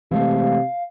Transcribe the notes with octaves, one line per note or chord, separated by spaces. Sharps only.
C3 E3 G#3 A3 F5